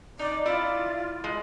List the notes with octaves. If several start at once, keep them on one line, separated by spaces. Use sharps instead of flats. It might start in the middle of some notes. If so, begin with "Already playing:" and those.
D#4 D5
E4 F4 D5
G#3